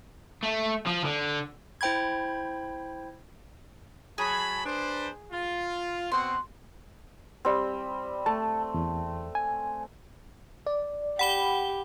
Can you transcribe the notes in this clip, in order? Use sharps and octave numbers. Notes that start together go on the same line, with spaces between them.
A3
F3
D3
E4 C5 G5 B5 G#6
F#3 G#4 A5 B5
D4 B4 C5
F4
B2 C4 F#5 C6
G3 C4
A3 A5
E2
G#5
D5
G4 F#5 B5 G7